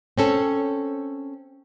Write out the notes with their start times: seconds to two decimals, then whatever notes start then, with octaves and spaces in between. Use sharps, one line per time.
0.18 C4 C#4 A4